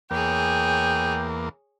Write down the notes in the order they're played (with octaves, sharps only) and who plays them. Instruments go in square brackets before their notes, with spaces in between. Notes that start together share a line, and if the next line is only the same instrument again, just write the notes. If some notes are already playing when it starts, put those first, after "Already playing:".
[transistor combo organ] E2 A#3 [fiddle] G#4 C#5 [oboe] G5